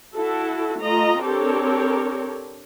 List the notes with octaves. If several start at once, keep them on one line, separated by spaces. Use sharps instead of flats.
E4 F#4 A4
A3 F4 D#5 A#5
C4 D4 G4 A4 A#4 C#5